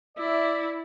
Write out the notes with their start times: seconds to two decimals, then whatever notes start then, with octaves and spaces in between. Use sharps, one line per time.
0.18 E4 D5 E5